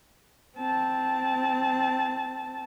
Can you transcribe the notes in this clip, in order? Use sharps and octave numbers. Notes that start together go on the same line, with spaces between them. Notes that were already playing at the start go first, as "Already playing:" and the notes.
C4 A5